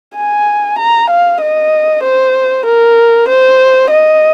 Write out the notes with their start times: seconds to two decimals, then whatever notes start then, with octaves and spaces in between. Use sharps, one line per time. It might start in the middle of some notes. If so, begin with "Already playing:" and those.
0.16 G#5
0.79 A#5
1.10 F5
1.41 D#5
2.03 C5
2.66 A#4
3.28 C5
3.90 D#5